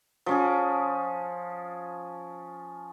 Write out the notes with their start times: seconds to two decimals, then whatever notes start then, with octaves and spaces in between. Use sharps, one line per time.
0.26 F3 C#4 G#4